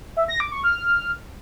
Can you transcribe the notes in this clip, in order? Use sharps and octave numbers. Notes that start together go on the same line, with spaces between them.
E5
A#6
D6
C#6
F6